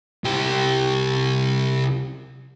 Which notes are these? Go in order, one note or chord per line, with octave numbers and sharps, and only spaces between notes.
C2 G4